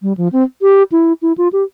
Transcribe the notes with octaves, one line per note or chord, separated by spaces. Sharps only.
G3
F3
C4
G4
E4
E4
F4
G4